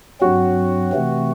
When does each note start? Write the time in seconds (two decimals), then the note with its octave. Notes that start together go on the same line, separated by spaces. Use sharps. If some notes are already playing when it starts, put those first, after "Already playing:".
0.21 G2 F#3 C4 F#4
0.92 C3 E3 A3 C4